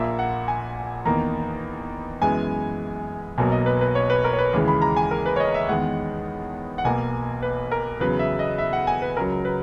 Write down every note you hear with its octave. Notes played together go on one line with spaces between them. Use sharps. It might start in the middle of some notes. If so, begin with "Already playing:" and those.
Already playing: A#1 A#2 A#3 E5
F#5
G#5
E2 D#3 A#3 A#5
F#2 E3 G#3 B3 G#5
B1 B2 F#3 A#3 G#5
D#5
B4
B4
C#5
B4
A#4
C#5
B4
D#2 C#3 E3 G#3
B5
A#5
G#5
A#4
B4
C#5
D#5
E5
E2 D#3 G#3 F#5
F#5
B1 B2 A#3 G#5
B4
A#4
E2 C#3 F#3 B4
E5
D#5
E5
F#5
G#5
B4
C#2 C#3 F#3 A#4
B4